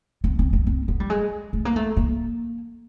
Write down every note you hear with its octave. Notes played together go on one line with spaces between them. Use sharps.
C4
C4
C4
C4
B3
G3
G#3
A3
A#3
A3
A#3